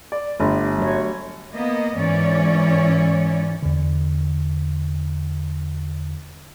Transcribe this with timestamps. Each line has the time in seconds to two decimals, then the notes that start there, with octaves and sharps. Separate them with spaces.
0.12 D5
0.40 G1 A3 D4 G4
0.79 F#3 C#5
1.53 A#3 B3 D#5
1.95 G#2 E3 C#4 C#5 D5
3.63 E2 D3